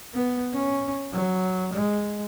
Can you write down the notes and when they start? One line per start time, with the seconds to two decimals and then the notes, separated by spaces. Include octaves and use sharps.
0.14 B3
0.53 C#4
1.12 F#3
1.73 G#3